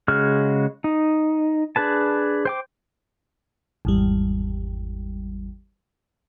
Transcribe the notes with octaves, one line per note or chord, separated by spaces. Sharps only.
C#3 G#3 F#4 F6
D#4
D4 G#4 B4 A5
C5 G5 D6
G#1 E2 G3